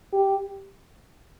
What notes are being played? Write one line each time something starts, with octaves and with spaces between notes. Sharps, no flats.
G4